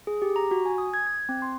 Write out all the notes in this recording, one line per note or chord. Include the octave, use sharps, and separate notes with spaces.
G#4
G4
A#5
F#4
G#5
D#6
G#6
G#6
C4
C6